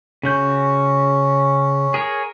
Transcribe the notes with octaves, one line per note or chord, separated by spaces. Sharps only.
C#3 C#4 F#4 G6
G#4 A#4 C#5